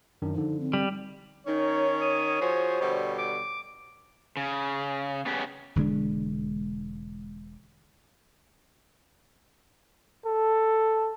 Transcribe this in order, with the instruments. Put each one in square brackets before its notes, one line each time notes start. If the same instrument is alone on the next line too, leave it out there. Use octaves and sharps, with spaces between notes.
[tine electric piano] F#2 D#3 D4
[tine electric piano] D3 F3 [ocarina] D#4
[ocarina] C4
[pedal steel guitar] G3
[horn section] D#3 C#4 [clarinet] D#4 [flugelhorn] C#5
[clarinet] D#6
[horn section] F3 F#4 G#4 [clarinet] C5
[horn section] B2 D3 G3
[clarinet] D6
[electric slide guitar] C#3
C#3 B3 C#4 G4
[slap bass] E1 D3 G#3 D4
[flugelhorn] A4